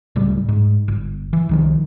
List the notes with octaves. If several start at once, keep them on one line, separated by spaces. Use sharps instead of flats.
D1 C#2 A2 G3
G#2
G1
E3
C2 D#3 F3